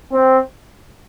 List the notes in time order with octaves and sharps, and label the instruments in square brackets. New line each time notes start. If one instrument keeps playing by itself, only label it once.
[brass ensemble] C4